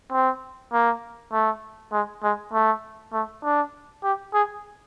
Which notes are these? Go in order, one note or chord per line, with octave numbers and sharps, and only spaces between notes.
C4
A#3
A3
G#3
G#3
A3
A3
D4
G4
G#4